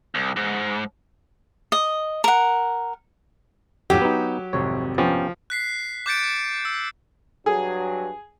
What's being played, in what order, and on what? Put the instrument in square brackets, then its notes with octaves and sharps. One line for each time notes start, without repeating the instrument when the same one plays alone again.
[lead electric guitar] C2
G#2
[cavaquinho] D#5
A#4 F#5
[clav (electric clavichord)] F2 A2 [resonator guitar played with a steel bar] F#3 [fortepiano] G4
[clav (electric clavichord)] B3 D#4
[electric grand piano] G#1 F2 C3 [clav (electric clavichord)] C#5
[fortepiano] F3 [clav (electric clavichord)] B3 C#4 G4
[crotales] F#6 B6 C7
D6 F#6 G6 A6 C#7 D7
E6
[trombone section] G2 F#3 [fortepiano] G#4